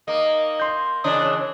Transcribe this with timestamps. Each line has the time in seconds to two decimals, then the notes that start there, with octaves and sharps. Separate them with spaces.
0.08 A#3 D#4 D#5
0.60 C6 G6
1.04 C#3 E3 D4 C#5 D#5